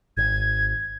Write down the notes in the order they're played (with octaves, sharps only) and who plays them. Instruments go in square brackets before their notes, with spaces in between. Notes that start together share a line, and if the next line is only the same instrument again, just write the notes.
[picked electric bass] G#1 [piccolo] G#6